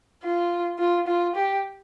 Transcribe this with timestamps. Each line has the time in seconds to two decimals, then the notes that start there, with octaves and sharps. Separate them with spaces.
0.24 F4
0.79 F4
1.07 F4
1.36 G4